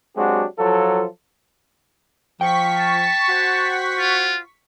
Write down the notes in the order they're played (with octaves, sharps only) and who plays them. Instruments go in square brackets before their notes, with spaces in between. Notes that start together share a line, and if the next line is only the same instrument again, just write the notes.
[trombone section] F#3 G#3 C4 D4 F#4 G4
F3 F#3 F4 A4
[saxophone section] F3 [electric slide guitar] G5 [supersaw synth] C#6 B6
[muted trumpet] A5
[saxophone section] F#4 C5 F#5
[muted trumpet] F4